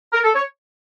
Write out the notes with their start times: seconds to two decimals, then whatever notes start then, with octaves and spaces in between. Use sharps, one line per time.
0.13 A#4
0.24 A4
0.35 C#5